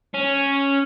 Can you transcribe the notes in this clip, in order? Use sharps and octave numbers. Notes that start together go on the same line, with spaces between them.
C#4